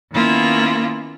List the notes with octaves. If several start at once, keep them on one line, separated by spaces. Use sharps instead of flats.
D#3 A#3 B3 C#4 E4 F4